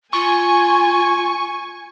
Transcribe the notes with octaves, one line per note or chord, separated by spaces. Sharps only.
F4 G#5 C#6